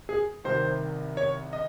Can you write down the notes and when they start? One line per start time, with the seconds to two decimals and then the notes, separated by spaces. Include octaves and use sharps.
0.09 G#4
0.44 C2 C3 D#3 C5
1.17 C#5
1.53 D#5